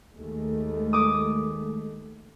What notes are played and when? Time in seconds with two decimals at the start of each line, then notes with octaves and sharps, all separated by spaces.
0.14 D#2 G#3 A3
0.93 D6 D#6